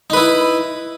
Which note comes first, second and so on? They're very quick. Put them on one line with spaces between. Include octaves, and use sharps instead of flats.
D#4 B4 E4